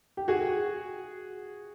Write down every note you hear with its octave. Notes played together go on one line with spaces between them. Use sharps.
G4
F#4 G#4